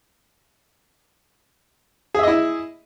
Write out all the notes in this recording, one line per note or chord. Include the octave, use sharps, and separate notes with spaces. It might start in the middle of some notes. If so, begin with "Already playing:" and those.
E4 G#4 D#5 E5